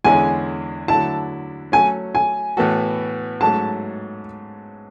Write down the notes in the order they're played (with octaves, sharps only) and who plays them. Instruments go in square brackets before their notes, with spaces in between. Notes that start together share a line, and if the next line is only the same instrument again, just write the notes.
[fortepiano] E2 D3 G#3 C#4 E4 [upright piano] G#5
[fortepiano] D3 F#3 A3 E4 [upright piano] A5
[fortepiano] F#3 A3 C#4 [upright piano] G#5
[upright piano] G#5
[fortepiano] A2 E3 B3 F#4 A4
[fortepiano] G#2 F#3 A3 C#4 [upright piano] A5